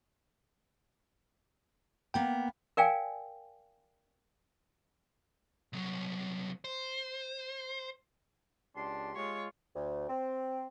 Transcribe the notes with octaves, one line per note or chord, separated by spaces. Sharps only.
A#3 B3 G5 A#5
A#4 D5 F5 G5 G#5
C2 F#3
C5
C#2 D4 G4 C6
G#3 F4 C#5
D2
C4